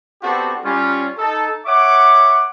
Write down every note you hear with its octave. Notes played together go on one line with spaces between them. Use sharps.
B3 C4 D4 F#4 G4 A4
G3 C#4 F4
D#4 A4
C#5 E5 F#5 C#6 D6